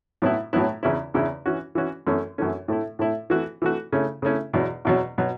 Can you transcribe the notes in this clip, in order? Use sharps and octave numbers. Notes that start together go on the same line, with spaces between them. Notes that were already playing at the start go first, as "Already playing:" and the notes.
A2 F#3 B3 E4
A2 F#3 B3 E4
E2 C#3 E3 C#4 E4
E2 C#3 E3 C#4 E4
E3 C#4 F#4
E3 C#4 F#4
F#2 E3 A3 C#4
F#2 E3 A3 C#4
A2 A3 E4
A2 A3 E4
E3 A3 F#4
E3 A3 F#4
C#3 A3 C#4 E4
C#3 A3 C#4 E4
E2 B2 F#3
E2 B2 F#3
B2 F#3